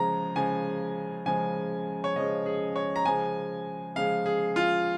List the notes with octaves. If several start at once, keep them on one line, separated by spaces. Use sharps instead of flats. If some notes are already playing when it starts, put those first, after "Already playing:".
Already playing: C#3 F3 G#3 A#5
C#3 F3 G#3 G#5
C#3 F3 G#3 G#5
C#5
C#3 F3 G#3 D#5
G#4
C#5
A#5
C#3 F3 G#3 G#5
C#3 F3 G#3 F5
G#4
F4